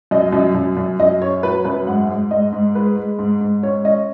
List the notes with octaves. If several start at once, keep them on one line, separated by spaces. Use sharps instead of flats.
F#2 D#5
F#2
F#2
F#2
F#2 D#5
C#4 C#5
F#3 B4
F#2 B4
G#2 F#5
G#2
G#2 D#5
G#2
G#3 B4
G#3
G#2
G#2
C#4 C#5
C#4 D#5